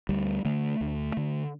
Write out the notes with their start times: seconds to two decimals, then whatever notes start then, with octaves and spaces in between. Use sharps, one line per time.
0.09 D2 G3
0.45 D3 A3
0.81 D2
1.17 D3